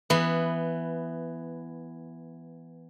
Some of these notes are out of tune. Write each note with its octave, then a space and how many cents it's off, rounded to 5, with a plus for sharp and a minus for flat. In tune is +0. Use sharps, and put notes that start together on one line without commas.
E3 +10 B3 +0